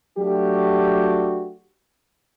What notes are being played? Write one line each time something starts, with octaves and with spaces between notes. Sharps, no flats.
F#3 A3 D4 F#4 G4